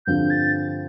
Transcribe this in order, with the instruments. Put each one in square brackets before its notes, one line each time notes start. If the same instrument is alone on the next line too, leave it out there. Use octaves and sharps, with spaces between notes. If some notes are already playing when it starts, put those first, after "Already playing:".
[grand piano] G2 D3 F3 C4 F4 [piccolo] G6
[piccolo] A6